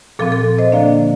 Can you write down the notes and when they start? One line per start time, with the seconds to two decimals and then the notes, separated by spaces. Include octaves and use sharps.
0.19 A#2 F3 C4 A4
0.32 A4
0.59 C5 D#5
0.72 D3 F3 A#3 D4 D5 F5